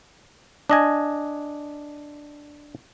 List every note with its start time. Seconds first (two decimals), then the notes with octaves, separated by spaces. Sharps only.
0.70 D4 D#5 G#5